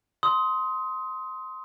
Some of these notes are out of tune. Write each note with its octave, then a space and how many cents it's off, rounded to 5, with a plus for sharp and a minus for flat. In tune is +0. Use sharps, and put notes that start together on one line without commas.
C6 +0 D#6 +25